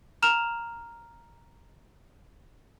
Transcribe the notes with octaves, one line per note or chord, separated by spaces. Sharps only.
A#5 F6 E7 F7